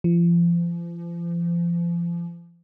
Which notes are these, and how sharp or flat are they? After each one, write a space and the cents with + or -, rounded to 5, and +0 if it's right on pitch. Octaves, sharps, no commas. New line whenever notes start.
F3 -35